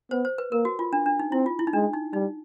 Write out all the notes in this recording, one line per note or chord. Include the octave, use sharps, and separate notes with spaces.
B3 C5
C5
B4
A#3 A#4
F#4
F4
D4
D4
D#4
C4 E4
F4
E4
D#4
G#3 D4
D#4
G3 D#4